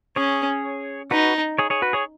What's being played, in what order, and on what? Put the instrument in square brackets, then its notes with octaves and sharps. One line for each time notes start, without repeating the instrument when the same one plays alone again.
[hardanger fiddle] C#4 [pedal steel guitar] G#4 C#5
[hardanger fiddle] D#4 [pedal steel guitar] F#4 B4
[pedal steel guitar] G#4 C#5
G#4 C#5
F#4 B4
G#4 C#5